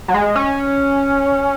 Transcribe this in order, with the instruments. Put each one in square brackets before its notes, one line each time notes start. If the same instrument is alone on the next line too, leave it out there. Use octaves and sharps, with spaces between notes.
[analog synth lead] F#3
G#3
C#4